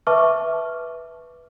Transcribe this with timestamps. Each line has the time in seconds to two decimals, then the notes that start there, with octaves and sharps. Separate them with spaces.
0.07 B4 E5 A5 C#6 D6 F6